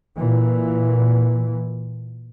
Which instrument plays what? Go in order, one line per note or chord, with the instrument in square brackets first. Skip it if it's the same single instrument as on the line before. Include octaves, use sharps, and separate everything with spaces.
[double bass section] A#2 E3